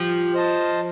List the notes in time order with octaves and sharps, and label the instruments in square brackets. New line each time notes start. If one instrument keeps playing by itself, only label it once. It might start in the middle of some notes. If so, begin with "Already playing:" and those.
Already playing: [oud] F3 [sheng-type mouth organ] G4
[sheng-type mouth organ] C5 D#5 A5